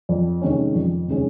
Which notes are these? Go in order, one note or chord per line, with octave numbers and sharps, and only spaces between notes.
F2
C3 D#3 G#3 C#4
F2
C3 D#3 G#3 C#4